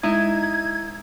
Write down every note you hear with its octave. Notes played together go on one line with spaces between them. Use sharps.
G#3 D#4 E4 G#6